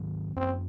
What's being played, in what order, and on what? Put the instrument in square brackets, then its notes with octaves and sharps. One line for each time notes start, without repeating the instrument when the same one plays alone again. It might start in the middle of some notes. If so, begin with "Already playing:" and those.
Already playing: [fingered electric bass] G#2 D#3 F#3 C4
[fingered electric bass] F#2 F3 A#3 C#4 [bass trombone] C4